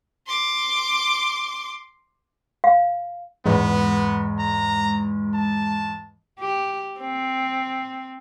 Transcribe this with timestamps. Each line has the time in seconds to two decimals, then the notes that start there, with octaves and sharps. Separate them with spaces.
0.27 C6 D6
2.64 F5
3.46 E2 G#2 G#3 B3
4.40 A#5
5.34 A5
6.40 G4
6.99 C4